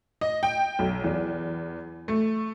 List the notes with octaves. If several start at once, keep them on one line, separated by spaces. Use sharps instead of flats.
D#5
G5
B1
E2
A3